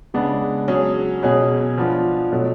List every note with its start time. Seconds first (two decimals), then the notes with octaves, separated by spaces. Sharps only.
0.14 C#3 G#3 B3 D4
0.68 F#3 C#4 G#4
1.23 B2 F#3 C#4 G#4
1.78 F3 B3 D4 F4
2.32 B2 F#3 A3